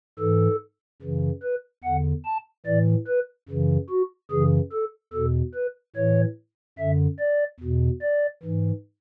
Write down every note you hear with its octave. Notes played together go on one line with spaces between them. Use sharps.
G#2 E3 A4
F#2 C#3 E3
B4
E2 D3 F#5
A5
A2 E3 D5
B4
F#2 C#3 E3
F#4
F#2 C#3 E3 G#4
A4
E2 B2 A4
B4
A2 E3 C#5
F#2 D3 E5
D5
E2 B2
D5
G#2 E3